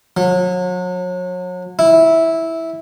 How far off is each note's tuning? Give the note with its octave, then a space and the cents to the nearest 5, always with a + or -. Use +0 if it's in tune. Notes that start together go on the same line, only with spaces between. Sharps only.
F#3 -35
E4 -10